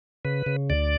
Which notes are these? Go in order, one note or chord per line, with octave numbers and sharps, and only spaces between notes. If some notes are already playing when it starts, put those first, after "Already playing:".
C#3 B4
C#3
D2 D5